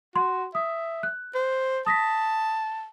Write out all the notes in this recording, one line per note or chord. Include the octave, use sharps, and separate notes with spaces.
F#4 C6
E5 D#6
F#6
C5
A5 D#6 A#6 B6